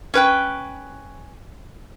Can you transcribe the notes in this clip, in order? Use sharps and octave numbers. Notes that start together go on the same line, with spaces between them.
C#4 B4 G5